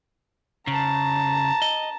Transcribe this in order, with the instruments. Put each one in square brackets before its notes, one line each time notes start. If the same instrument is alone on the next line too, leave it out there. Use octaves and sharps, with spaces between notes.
[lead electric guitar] C#3 [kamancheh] A5 A#5
[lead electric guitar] D#5